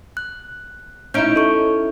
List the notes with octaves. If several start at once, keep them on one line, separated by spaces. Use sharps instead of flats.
F#6
C#4 D#4 E4 G6 D7
A4 C#6